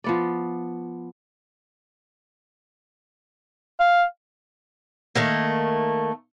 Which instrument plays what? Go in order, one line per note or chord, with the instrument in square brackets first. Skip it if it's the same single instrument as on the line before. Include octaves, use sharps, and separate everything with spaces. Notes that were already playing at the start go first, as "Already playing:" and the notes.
[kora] F3 B3 D5
[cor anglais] F5
[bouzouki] D#3 A3 A#3